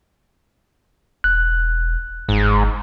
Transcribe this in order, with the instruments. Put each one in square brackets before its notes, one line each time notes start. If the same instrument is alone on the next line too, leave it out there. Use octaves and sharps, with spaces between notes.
[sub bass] E1 [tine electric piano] F#6
[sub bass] G1 [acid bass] G#2